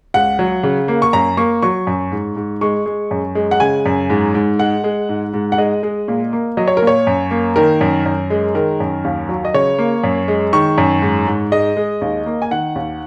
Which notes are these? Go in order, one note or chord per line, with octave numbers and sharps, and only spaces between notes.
C#2 F#5
F#3
C#3
A#3
C#6
F#2 A#5
A#3 C#6
F#3 C#6
F#2
G#2
G#2
G#3 C#6
G#3
F#2
G#3
F#5
C#3 G#5
F#2
G#2
G#2
G#3 F#5
G#3
G#2
G#2
F#5
G#3 D#5
G#3
A#2
A#3
F#3 D#5
C#5
A#4
A#2
C#5
F#2
A#3
D#3 A#4
F#2
F#2
G#3
D#3 A#4
F#2
D#2
F#3
D#5
C#3 C#5
A#3
F#2
G#3
D#3 C#6
F#2
G#2
G#2
G#3 D#5
G#3
D#2
A#3
G#5
D#3 F#5
D#2